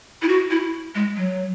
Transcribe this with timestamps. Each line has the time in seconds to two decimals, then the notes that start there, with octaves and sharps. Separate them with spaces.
0.22 E4
0.29 F#4
0.51 E4
0.95 G#3
1.16 F#3